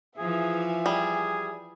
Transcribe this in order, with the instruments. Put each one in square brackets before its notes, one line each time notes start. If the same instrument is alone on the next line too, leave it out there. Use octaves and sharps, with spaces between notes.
[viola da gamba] E3 F3 [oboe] G#4 [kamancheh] E5 G#5
[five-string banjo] G3 [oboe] G#4